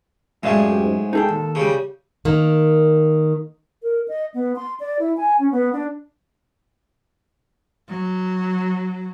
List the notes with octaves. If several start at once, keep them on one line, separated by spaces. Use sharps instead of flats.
F#2 A2 G#3 G4 D5 E5 F5
D2 G4
G#2
D#4 G#4 A4 G5
D#2
C#3 G3
D#3 A#3
A#4
D#5
B3
C6
D5
E4
G#5
C#4
B3
D4
F#3